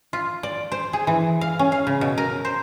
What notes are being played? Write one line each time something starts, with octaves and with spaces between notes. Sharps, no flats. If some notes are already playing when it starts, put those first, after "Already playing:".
F4
D5
C5
G#4
E3
F5
C#4
F5
C#3
B2
A#4
C5